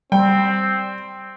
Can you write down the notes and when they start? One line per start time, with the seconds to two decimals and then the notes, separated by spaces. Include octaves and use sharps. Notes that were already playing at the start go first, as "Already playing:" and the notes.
0.12 G3 C4 G5